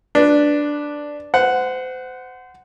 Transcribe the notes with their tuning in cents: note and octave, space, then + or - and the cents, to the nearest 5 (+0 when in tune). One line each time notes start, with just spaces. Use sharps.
D4 +0 B4 +0
C5 -30 F#5 +0